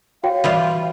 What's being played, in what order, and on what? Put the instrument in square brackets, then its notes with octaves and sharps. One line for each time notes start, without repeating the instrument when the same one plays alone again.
[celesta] F#4 C#5 G5 [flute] F5
[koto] E3 G3 F4